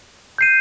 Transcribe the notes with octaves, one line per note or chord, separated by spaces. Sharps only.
G6 C7 D#7